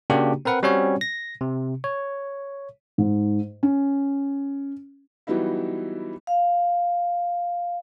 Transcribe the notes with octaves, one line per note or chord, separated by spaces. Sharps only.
C#3 A#3 D4 F#4 G4
C4 A#4 B4 F#5
G3 C4 C#4 F#4 C#5
A#6
C3
C#5
G#2
C#4
E3 F#3 G3 B3 D#4 E4
F5